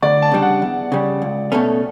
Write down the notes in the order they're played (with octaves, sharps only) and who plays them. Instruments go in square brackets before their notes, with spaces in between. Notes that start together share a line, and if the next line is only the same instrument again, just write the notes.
[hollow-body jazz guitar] D2 [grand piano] D5
[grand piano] A5
[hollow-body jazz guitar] C#3 G3 D4
[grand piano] F#5
[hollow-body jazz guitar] E2
C#3 G3
C#2
B2 A3 C#4